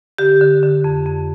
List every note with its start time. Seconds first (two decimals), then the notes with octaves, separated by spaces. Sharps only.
0.18 D3 G4
0.41 D3
0.63 D3
0.84 F2
1.07 F2